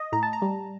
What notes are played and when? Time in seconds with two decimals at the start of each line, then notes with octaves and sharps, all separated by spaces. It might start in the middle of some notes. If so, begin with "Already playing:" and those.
Already playing: D#5
0.12 A2 A#5
0.23 A5
0.33 A#5
0.42 G3